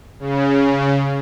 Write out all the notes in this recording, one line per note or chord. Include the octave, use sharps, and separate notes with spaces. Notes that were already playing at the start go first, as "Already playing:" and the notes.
C#3